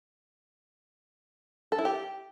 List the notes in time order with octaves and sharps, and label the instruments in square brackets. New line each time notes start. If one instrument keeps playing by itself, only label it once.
[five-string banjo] A4
E4
G4